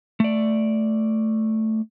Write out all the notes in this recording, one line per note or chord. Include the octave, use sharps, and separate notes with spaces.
A3 D5